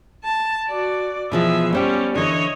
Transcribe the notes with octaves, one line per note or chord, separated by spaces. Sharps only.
A5
F#4 D5
B2 E3 F3 G#4 E5
G3 B3 C#4 C5 G5
D3 E3 C#5 D#5